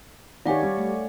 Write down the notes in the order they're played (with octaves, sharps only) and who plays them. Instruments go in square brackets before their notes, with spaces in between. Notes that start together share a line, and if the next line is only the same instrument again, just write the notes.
[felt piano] D#3 G4 [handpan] C#5 D5 [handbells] F5 F#5 G#5
[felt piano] G3
[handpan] A3